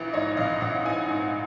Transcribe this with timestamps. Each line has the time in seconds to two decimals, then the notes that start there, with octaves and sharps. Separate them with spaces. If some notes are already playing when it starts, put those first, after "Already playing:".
Already playing: A#1 E3 E5
0.13 G#2 C#5 D#5
0.37 A#1 D#5 F5
0.61 A#1 E5 F#5
0.85 E3 F#5 G#5
1.09 G#2